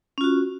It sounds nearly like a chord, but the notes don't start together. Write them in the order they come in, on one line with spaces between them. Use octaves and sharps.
C#4 F4 F#4